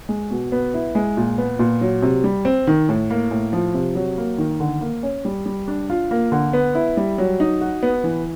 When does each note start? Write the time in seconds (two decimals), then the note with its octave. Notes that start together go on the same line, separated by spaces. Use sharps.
0.09 G#3
0.31 B2
0.52 B3
0.74 E4
0.95 G#3
1.17 A#2
1.38 B3
1.59 A#2
1.81 F#3
2.02 C3
2.24 G3
2.45 C4
2.67 D#3
2.89 A2
3.10 A#3
3.31 A2
3.53 F3
3.74 C3
3.95 F#3
4.18 A#3
4.38 D#3
4.60 D3
4.81 A#3
5.03 C#4
5.25 G3
5.46 G3
5.68 D4
5.90 F4
6.11 A#3
6.32 D3
6.53 B3
6.75 E4
6.97 G3
7.18 F#3
7.40 D#4
7.61 F#4
7.83 B3
8.04 E3